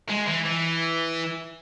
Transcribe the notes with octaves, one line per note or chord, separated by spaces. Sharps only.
G#3
E3
E3